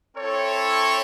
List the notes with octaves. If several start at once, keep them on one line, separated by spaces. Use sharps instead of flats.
C4 E4 A4 C#5